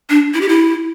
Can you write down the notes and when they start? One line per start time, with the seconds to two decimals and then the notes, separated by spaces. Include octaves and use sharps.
0.10 D4
0.34 E4
0.41 G4
0.49 E4